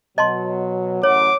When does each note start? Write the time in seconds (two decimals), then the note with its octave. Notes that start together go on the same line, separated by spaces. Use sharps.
0.18 B2 F#3 D#5 A5 C6
1.03 A1 F#2 C#5 F#5 D6